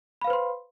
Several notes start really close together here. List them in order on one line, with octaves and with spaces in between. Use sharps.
B5 F5 B4 C5 C6